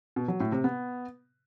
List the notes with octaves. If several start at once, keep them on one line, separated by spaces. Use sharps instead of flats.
B2
F#3
A2
C3
B3